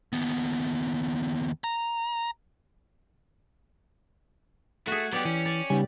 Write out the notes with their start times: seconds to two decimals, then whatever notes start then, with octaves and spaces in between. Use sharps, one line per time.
0.13 D#2 B3
1.64 A#5
4.87 A3 F#4 G#4
5.12 F#3 B3 G4 D5
5.25 E3 C#4
5.46 D5
5.70 C#3 G3 B3 D#4 G#5